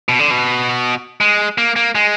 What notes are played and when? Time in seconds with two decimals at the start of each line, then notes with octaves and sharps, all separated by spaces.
0.09 B2
0.19 D3
0.31 B2
1.21 G#3
1.58 A#3
1.76 A#3
1.95 G#3